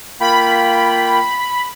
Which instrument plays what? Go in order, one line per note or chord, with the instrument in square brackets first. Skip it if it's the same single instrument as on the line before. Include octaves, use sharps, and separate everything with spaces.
[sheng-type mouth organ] A#3 F4 G5 [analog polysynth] B5